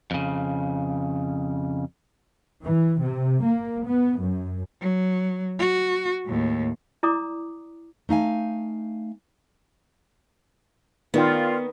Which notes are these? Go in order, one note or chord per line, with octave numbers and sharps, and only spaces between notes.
F2 C#3
E3
C3
A#3
B3
F#2
F#3
F#4
D#2 A2
E4 D5 A#5 D6 D#6
A3 D#4 F5 G#5
D#3 B3 F4 A#4 D5 G5